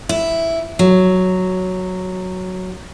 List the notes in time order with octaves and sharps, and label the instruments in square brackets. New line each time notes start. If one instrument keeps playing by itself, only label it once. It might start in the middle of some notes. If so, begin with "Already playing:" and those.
[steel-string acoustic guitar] E4
F#3